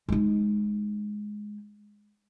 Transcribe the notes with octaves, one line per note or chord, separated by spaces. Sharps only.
G#3 D#4